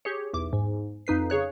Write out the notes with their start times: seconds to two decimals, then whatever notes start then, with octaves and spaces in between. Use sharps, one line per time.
0.05 G4 G#4 C#5
0.33 B1 E2 D6
0.53 G#2
1.07 F2 D#4 B4 C7
1.30 C#3 G#4 C#5 F#6